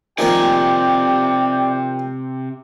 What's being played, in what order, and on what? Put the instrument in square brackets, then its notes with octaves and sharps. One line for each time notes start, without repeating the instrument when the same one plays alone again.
[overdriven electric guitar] C3 G#5 [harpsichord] D#3 F3 A#3 [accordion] G4 D5 [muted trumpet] G5